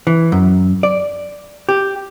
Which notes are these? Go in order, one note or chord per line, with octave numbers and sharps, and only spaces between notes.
E3
F#2
D5
G4